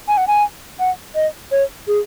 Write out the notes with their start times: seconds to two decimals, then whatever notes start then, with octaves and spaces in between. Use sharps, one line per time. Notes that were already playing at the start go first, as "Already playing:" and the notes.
0.08 G#5
0.17 F#5
0.28 G#5
0.80 F#5
1.15 D#5
1.52 C#5
1.88 G#4